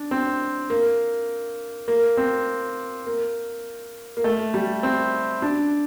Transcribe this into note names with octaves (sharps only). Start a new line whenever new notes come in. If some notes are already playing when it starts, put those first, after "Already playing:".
Already playing: D4
C4
A#3
A#3
C4
A#3
A#3
A3
G3
C4
D4